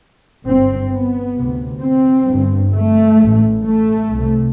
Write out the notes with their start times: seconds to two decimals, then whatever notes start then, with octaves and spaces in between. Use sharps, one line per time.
0.46 G1 G2 C4
0.90 B3
1.37 D2 C3
1.82 C4
2.28 G1 G2
2.74 A3
3.19 A1 A2
3.64 A3
4.09 C2
4.14 C3